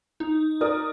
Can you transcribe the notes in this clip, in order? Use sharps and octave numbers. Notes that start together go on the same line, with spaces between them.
D#4
A#4 D5 D#6